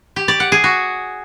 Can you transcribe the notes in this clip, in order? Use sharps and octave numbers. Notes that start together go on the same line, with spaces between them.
G4
D5
F#5
G#4
F#4